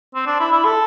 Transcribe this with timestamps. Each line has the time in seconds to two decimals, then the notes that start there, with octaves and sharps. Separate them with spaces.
0.15 C4
0.27 D4
0.40 E4
0.52 E4
0.65 A4